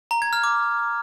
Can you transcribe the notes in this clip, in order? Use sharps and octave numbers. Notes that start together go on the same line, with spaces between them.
A#5
G#6
F6
D6